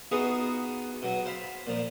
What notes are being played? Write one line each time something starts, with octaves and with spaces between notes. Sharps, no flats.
B3 D#4 F4 F#4 G#4
B2 F#3
C5 F5 B5
A#2 F3